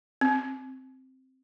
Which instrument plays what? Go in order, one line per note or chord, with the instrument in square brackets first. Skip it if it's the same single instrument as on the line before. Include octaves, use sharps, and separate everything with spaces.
[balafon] C4